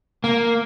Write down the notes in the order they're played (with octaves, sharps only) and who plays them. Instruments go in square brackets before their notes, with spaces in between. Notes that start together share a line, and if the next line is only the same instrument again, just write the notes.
[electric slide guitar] A#3